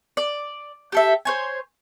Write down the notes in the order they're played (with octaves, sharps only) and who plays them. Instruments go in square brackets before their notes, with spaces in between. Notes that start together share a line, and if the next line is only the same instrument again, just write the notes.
[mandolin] D5
G4 A4 E5
C5 C#5 G#5